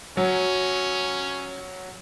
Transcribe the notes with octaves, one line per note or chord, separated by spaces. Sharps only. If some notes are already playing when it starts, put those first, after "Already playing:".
F#3 C#4